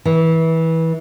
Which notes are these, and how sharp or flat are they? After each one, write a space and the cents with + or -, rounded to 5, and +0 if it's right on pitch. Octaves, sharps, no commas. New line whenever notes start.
E3 -20